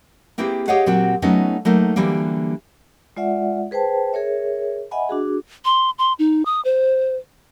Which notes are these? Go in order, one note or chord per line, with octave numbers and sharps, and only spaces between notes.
A#3 C4 E4 G4 G#4 B4
G4 G#4 C#5 D#5 F5 F#5
A#2 F#3 C4 F#4
F#3 A3 B3 C#4 D#4 F4
F#3 A3 A#3 D#4
D3 E3 F#3 G3 A#3
G#3 F4 D5 E5 F#5
G#4 B4 C5 G5 A5
G#4 A#4 C#5 E5
D#5 E5 F#5 G#5 B5
D4 F#4 G#4
C6
C6
D#4
D#6
C5